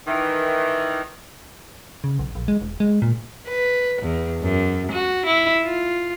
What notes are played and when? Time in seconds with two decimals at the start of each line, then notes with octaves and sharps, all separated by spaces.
0.07 D#3 E3
2.04 C#3
2.19 B1
2.35 A#1
2.48 G#3
2.62 E1
2.80 G#3
3.02 A#2
3.47 B4
4.02 E2
4.42 F#2
4.92 F#4
5.26 E4
5.64 F4